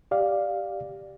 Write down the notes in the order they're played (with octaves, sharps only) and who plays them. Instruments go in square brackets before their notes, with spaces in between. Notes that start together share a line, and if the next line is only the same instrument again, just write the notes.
[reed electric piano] G4 D5 F5